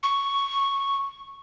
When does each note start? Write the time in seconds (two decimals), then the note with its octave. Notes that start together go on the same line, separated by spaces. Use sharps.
0.03 C#6